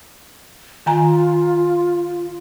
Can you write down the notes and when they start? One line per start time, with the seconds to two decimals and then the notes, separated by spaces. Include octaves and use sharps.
0.86 D#3 F4 G#5 A#5